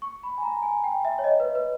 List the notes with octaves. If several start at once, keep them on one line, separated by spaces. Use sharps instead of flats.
C#6
B5
G#5
A#5
G#5
G5
E5
C#5
D#5
B4
B4